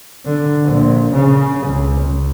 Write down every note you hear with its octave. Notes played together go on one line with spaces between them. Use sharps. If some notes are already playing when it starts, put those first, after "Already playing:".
D3
A#1
C#3
C#2
C#2